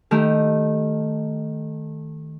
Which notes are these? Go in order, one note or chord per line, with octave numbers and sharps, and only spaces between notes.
D#3 A3 G4